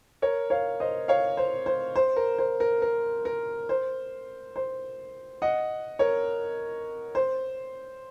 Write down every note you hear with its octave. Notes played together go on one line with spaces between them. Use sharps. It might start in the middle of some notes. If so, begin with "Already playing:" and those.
A#4 C#5
C#5 F5
C5 D#5
C#5 F5
C5
C5
C5
A#4
C5
A#4
A#4
A#4
C5
C5
D#5 F#5
A#4 C#5
C5